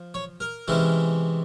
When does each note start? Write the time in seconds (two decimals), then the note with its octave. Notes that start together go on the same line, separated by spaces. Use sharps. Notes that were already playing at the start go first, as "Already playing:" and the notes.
Already playing: F3
0.14 C#5
0.40 A#4
0.68 C3 E3 G#3 C#4 E4